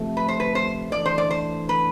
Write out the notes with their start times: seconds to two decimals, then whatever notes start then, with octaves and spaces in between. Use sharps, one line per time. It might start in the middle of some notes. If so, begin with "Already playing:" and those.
Already playing: C3 F3 A3
0.17 B4
0.28 C5
0.40 B4
0.55 C5
0.92 E3 A3 D4 A4 D5
1.06 C5
1.18 D5
1.31 C5
1.69 B4